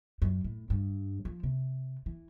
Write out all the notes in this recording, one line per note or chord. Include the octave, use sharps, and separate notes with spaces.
F#2
A2
G2
F3
C3
E3